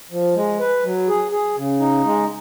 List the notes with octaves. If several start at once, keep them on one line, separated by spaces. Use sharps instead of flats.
F3
G#3
B4
F#3
G#4
G#4
C#3
D#4
G#3